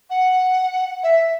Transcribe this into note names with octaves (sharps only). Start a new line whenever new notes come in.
F#5
E5